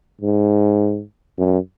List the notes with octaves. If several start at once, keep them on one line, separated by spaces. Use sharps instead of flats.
G#2
F#2